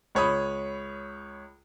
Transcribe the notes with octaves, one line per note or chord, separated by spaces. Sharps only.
C#2 C#5 B5 D#6